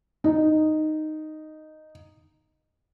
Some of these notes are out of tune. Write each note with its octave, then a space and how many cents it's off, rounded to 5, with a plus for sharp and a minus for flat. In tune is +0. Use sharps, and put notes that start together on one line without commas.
D#4 -5